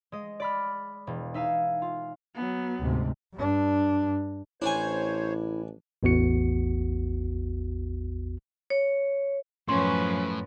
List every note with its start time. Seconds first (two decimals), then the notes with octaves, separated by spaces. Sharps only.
0.12 G#3 D#5
0.40 D5 B5 F6
1.07 E1
1.34 D#4 E5 F5 G#5
1.82 F4
2.35 F#3 B3
2.79 D2 G#2 C3
3.35 G2 D4
4.62 A1 D4 E4 C5 C#5 G#5
6.03 A1 E2 B3 F#4 C#7
8.70 C#5
9.69 F#2 A2 F3 C#4 B4 C6